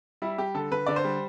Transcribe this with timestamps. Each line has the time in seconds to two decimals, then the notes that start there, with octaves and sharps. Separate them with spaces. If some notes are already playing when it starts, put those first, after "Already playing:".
0.22 G3 E4
0.38 G3 G4
0.54 D3 A4
0.71 D3 B4
0.86 D3 D5
0.96 C5
1.04 G3